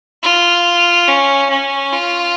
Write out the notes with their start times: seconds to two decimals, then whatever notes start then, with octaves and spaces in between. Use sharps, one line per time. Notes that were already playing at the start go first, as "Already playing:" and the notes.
0.23 F4
1.08 C#4
1.50 C#4
1.93 F4